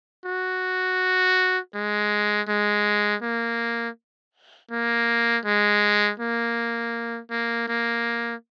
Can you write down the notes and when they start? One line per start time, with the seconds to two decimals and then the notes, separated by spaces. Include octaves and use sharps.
0.25 F#4
1.75 G#3
2.48 G#3
3.22 A#3
4.71 A#3
5.45 G#3
6.20 A#3
7.30 A#3
7.68 A#3